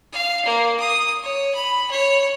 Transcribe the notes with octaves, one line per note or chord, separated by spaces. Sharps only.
F5
A#3
D#6
C#5
B5
C#5